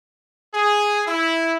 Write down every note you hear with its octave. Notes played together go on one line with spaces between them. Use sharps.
G#4
E4